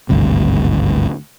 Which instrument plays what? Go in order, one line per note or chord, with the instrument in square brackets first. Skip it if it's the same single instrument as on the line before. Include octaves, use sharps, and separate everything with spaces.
[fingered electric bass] G#1 D2 G2 C3